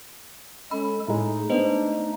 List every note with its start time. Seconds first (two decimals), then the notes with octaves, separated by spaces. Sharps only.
0.71 G#3 C#4 A4 B5
1.08 A2 G#3 A3 D#4 G#4
1.50 G#3 B3 D4 C5 D#5